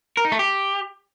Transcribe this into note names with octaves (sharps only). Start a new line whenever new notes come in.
A#4
D#4
A3
G4